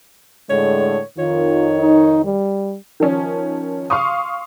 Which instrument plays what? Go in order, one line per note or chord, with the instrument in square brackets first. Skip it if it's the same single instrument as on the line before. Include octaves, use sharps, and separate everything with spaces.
[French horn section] A2 D3 G#3 [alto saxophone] C#5
[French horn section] F2 D#3 [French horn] F4 [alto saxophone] C#5
[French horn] D#4
G3
[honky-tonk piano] D#3 F3 C#4
F5 C6 C#6 D#6